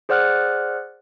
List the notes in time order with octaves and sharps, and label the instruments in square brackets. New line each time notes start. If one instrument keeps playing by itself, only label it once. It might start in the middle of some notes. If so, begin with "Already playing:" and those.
[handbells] G#4 C5 D5 F#5 F6 F#6